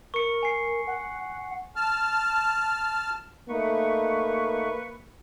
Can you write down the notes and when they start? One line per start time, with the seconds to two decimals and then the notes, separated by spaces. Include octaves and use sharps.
0.14 A#4 C#6 C#7
0.43 G#5 C7
0.87 F#5
1.76 A5 F6
3.49 A3 A#3 D#4 B4 C#6